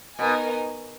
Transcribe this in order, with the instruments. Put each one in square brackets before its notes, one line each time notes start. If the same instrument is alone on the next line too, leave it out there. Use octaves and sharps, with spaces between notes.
[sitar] B2 [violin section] B3 D#4 A#4 D#5 G#5